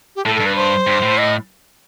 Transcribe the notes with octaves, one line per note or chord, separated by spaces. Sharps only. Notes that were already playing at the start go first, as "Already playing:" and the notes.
G4
A2 A4
G2 A4
B4
C5
G2
A2
D#5